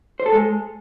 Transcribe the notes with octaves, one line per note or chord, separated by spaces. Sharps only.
C5
A4
G#3